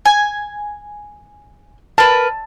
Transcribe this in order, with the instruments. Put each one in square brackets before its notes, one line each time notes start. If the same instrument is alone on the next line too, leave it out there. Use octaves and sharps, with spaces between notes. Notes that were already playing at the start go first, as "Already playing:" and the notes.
[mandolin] G#5
[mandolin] A#4 B4 [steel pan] A5